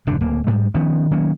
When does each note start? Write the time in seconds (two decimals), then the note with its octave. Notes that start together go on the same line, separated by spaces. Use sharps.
0.07 F1 G#2 D3 D4
0.21 D1 A#3
0.47 G#2 G3 G#3
0.74 D#3 F3 B3 C#4
1.11 D#3 F#3 A#3 C#4